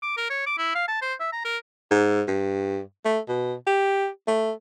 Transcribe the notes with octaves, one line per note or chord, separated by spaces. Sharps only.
D6
A#4
C#5
D6
E4
F5
A5
C5
E5
A#5
A#4
G#2
G2
A3
B2
G4
A3